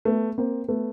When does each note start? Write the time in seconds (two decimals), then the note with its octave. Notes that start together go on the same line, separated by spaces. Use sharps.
0.05 A3 B3
0.38 A#3 C4
0.68 A3 B3